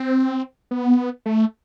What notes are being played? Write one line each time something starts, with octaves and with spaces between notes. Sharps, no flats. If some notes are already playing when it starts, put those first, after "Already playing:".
Already playing: C4
B3
A3